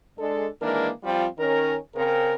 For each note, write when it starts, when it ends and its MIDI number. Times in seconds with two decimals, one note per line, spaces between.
0.19 0.47 56
0.19 0.47 62
0.19 0.47 69
0.62 0.91 51
0.62 0.91 52
0.62 0.91 56
0.62 0.91 58
0.62 0.91 62
0.62 0.91 70
1.04 1.27 53
1.04 1.27 55
1.04 1.27 60
1.04 1.27 65
1.38 1.76 51
1.38 1.76 61
1.38 1.76 70
1.96 2.35 49
1.96 2.35 60
1.96 2.35 70